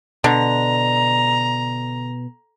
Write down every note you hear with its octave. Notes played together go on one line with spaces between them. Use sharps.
B2 D3 A#5